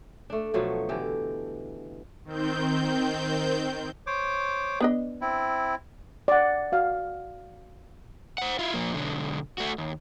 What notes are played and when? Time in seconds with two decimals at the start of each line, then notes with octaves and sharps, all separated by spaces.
0.30 A3 D4
0.54 B2 F3 F#3 A3
0.89 D3 E3 G4
2.24 D#3 C4 G6
4.07 C5 C#5 D6
4.80 B3 D4 D#5
5.21 C4 E4
6.28 D5 F#5
6.72 F#4 F5
8.38 C5 F#5
8.59 E4 F4
8.74 F3 A#3
8.93 B1 D3
9.58 A3 F#4
9.78 D#2